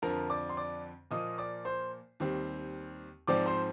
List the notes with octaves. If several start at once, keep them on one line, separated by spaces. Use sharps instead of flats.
F2 D3 F3 A#4 A#5
D5 D6
C6
D5 D6
A#2 F3 A#3 D#5 D#6
D5 D6
C5 C6
D#2 D#3 G3 C4
G#2 F3 C4 D5 D6
C5 C6